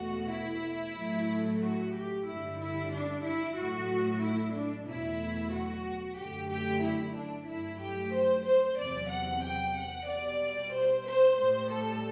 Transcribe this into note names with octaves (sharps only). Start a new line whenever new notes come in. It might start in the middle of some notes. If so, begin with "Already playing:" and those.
Already playing: E2 B2 A3 F#4
E4
A2 F#3 A3
F#4
G4
G2 D3 G3 E4
E4
D4
E4
A2 F#3 A3 F#4
E4
D4
E2 B2 F#3 A3 E4
F#4
F#2 D3 F#3 A3 G4
G4
E4
D4
G2 F#3 A3 E4
G4
C5
C5
E2 C3 F#3 D5
F#5
G5
F#5
B2 G3 D5
C5
C5
A2 G3 C5
A4